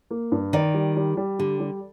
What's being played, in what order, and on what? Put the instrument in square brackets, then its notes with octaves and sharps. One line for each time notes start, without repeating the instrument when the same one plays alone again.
[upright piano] A#3
G2
[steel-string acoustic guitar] D#3 [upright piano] D5
[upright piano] G3
G3
G3
[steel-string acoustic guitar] D3 [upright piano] G4
[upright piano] G3